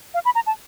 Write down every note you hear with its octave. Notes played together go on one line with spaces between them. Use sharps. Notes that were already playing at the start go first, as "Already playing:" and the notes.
F5
B5
A#5
A5